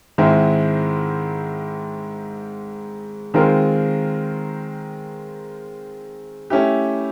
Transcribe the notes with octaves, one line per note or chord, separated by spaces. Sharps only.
G#2 D#3 G#3 C4 E4
D#3 G#3 C4 F4 A#4
A3 C#4 E4 G4